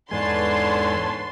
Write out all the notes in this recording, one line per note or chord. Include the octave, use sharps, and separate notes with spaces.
E2 G#2 D3 B4 C#5 G#5 A5 C6